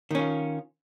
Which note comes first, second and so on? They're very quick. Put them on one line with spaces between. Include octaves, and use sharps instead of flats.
D#3 C#4 F4